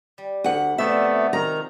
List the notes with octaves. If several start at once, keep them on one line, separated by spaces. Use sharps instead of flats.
G3
D2 F#5
C3 F3 A3 B3 D4 E5
D#3 A#5